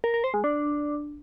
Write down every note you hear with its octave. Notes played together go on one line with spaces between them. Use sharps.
A#4
A#4
C5
G#3
D4